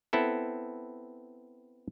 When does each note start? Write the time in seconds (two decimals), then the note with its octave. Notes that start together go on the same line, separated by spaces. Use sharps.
0.13 B3 C4 E4 A4